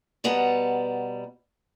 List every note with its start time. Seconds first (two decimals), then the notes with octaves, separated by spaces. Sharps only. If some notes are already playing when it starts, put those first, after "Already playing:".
0.24 B2 G3 B3 F#5 A5 A#5